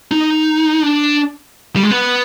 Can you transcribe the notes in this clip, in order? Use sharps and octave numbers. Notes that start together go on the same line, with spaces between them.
D#4
D4
G3
G#3
B3